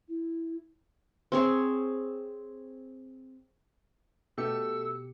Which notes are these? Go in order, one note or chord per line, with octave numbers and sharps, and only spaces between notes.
E4
C4 G#4 C#5
B2 A3 G4 E6 C#7